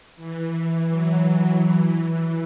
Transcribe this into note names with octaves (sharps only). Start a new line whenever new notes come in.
E3
F#3
E3